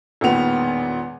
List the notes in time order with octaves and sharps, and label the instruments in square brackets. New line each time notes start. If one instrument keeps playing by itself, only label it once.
[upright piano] E1 A#2 D#3 B3 F7